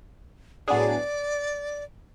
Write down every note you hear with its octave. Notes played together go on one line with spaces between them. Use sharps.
A2 F#3 B3 D4 G#4 D5